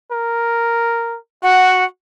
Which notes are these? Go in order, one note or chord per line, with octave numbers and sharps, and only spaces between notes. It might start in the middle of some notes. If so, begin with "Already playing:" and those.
A#4
F#4 F#5